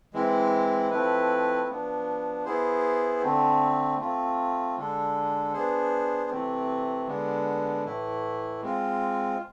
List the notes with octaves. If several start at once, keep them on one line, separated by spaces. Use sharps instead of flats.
E3 G#3 C4 E4
F3 A3 C4 E4 B4
F3 B3 D4
B3 E4 G#4 C5
D3 A3 C4
A3 C4 F4
D3 G#3 D4 A4
B3 D4 G#4 C5
C3 E3 A3 C4
D3 G#3 B3 D4
A2 E3 A3 E4
G#3 C4 F4